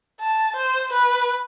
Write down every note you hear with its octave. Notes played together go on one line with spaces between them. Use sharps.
A5
C5
B4